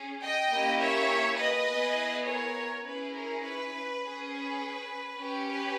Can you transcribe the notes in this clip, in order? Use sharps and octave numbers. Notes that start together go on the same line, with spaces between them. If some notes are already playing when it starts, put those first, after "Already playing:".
Already playing: C#4 G#4
D#5 G5
A#3 C#4 E4 G4
C#5 E5
B4 D#5
B3 E4 G#4
A#4 C#5
C#4 E4 G#4 B4
A#4
B4
C#4 G#4
B4
C#4 G4
B4